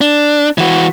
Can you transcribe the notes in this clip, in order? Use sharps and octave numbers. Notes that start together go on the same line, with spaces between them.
D4
E3 F#4